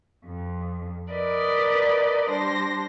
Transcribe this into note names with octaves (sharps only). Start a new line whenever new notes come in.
F2
A#4 B4 D5 D#5
G3 D4 C5 A#6